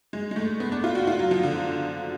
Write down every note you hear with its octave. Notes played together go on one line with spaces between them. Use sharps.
G#3
G#3
A3
B3
D4
F4
F#4
F4
F#3
F3
D3